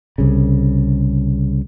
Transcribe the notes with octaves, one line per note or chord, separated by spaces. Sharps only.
C2 C#3